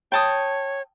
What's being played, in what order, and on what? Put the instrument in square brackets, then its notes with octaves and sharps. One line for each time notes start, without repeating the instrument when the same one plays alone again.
[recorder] C#5 [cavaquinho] G5 A5 D#6